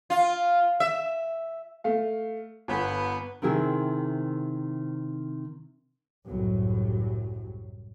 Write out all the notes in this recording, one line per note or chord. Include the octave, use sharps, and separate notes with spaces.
F4
E5
A3 F5
G1 B3
C3 D#3 C4 E4 G#4
C2 F#2 A2 F#3